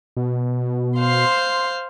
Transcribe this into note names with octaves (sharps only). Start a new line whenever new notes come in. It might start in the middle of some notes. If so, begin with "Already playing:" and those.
B2
C5 F5 C6